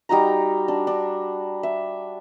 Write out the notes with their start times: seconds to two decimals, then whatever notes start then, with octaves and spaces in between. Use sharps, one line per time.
0.09 G3 D#4 F#4 A#5
0.68 D4
0.87 D4
1.63 E5